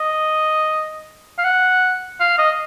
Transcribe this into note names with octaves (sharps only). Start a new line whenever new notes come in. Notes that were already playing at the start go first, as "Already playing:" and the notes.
Already playing: D#5
F5
F#5
F5
D#5